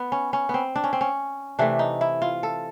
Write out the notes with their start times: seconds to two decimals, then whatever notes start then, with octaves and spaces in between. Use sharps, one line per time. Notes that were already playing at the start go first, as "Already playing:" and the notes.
Already playing: B3
0.12 C#4
0.33 C#4
0.49 B3 C4
0.76 D4
0.84 C#4
0.93 C4
1.01 C#4
1.59 C3 E3 A3 D4
1.79 D#4
2.01 E4
2.22 F4
2.43 A4